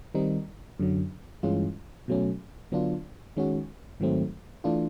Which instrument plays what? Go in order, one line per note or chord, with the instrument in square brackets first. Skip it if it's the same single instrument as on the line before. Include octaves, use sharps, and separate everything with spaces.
[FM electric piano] D#3 G3 C4 D#4
F#2 D3 F#3
G2 E3 G#3 C#4 F4
B2 F#3 A3 C#4
D3 F#3 B3 D4 F4
D#3 G#3 C#4 F#4
G#2 D#3 F#3 A3 C4
E3 A3 D4 F4